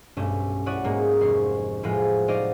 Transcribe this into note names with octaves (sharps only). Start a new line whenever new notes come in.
B1 G2 A3 C#4
E4 F#4 C#5 D5 F#5 D#6
G#2 G#3 A#3 C#4
F1 C6 C#6
A2 F3 G#3 B3 F4
F#3 D#4 C5 D5 D#5 F5